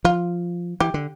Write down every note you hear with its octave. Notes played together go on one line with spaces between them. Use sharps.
F3 F4
E3 G4
D3